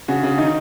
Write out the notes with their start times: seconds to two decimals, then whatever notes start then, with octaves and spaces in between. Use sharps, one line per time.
0.08 C#3 F#4
0.23 C#3
0.38 D#3 D#4